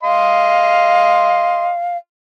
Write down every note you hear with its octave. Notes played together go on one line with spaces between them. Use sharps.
D#5 F5 C6